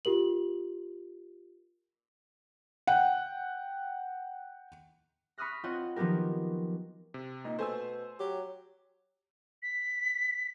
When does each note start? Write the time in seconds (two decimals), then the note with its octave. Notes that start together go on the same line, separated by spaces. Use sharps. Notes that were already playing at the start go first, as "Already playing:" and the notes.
0.05 F4 G4 A#4 F#7
2.87 F#5 G5
5.38 B5 C#6 D#6 F6 F#6 A#6
5.63 C4 F4 C#5 D#5 F#5 G5
5.96 D#3 F3 F#3 B3 G4 A#4
7.14 C3
7.44 A#2 D#4
7.59 B2 A3 C5 G#5 E6
8.20 F#3 G4
9.62 B6